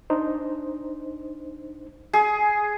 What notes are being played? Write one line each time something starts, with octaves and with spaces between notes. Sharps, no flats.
D4 D#4 C5
G#4